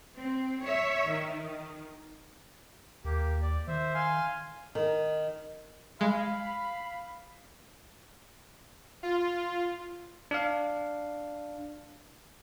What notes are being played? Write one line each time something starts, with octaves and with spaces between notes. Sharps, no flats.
C4
C#5 E5
D#3
D#2 A#3 G4
D5
D#3 C5 E5
F5 G#5 C6
D#3
G#3 F5 B5
F4
D4 F5